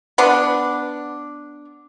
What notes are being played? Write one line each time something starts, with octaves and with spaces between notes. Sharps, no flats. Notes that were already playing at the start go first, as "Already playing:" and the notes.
B3 D4